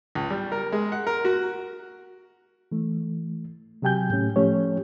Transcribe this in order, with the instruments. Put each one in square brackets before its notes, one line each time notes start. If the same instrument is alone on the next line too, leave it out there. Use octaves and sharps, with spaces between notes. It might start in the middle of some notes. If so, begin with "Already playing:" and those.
[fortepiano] C#2
G3
A#4
G#3
F#5
A#4
F#4
[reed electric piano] E3 A3
C3 F#3 G4 G5 G#5 G6
A2 A3 C#4
F3 A3 C#4 G4 C#5